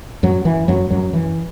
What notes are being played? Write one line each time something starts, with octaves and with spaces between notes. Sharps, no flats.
F#2 F#3
E3
F#2 F#3
F#2 F#3
E3